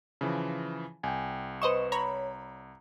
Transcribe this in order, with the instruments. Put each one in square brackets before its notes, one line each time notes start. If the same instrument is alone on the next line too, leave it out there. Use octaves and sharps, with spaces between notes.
[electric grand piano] C#3 E3 F3
[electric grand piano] C2 [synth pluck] G5 G#5
[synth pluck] B4 E7 [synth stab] C5 D#5 C#6
[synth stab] C#5 B5 [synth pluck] A#5